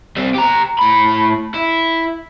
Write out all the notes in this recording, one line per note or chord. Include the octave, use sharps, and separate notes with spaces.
G3 C4
G4 A#5
A2 B5
E4